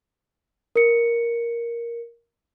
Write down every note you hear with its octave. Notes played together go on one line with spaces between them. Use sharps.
A#4 C#7